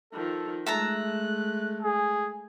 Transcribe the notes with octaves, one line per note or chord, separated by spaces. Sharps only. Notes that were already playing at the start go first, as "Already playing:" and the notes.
D#3 F3 A4
G#3 A3 E5 A5 A#5 F#6
G#4